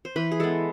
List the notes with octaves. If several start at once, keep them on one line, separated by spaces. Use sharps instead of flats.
C5
E3 B4
G#4
G#3 B3 A4